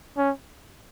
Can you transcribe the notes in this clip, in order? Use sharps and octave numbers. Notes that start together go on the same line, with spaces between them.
C#4